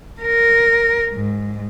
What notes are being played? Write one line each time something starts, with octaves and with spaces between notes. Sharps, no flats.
A#4
G#2